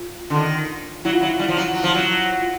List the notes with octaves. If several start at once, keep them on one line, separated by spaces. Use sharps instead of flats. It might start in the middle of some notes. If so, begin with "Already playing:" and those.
Already playing: F4
D3
D#3
F#3 E4
F4
F#3 E4
G3
F3
F#3
F#3
F3
F#3
F4